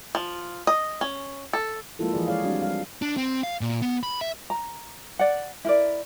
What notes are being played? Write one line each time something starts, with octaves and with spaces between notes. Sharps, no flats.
F3
D#5
C#4
A4
F3 G#3 A#3 E4 F4 A4
E3 F3 G#4 D5
G#3 G#4 C#5 D5 F5
G3 C4 D4 F#4 D5
G3 F5
D4
C4
F5
A#2
B3
B5
E5
A#5
D5 F#5
E4 A#4 D5